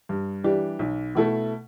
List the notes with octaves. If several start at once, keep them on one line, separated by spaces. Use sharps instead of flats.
G2
E3 G3 D4 G4
B1
B2 A3 E4 A4